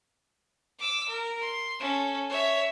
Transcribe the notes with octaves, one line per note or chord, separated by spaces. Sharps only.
D6 E6
A#4
C6
C#4 A4
C#5 E5